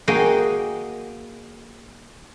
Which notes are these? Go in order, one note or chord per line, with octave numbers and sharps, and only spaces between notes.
A#3 F#4 G#4 D#5 G5